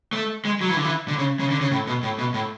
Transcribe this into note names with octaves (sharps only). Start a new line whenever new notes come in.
A3
G#3
F#3
E3
D3
E3
D3
C#3
C#3
D3
C#3
A2
B2
A2
B2
A2